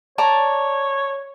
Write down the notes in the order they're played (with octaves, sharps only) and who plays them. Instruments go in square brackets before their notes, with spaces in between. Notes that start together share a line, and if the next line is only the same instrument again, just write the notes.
[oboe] C#5 [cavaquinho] D5 A5 A#5